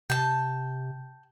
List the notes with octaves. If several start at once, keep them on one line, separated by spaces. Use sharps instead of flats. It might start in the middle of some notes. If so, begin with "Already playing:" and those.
C3 G5 A5